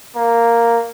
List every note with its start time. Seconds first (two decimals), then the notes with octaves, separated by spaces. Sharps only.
0.15 A#3